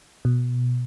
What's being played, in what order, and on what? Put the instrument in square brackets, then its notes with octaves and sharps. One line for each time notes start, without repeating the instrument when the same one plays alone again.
[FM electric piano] B2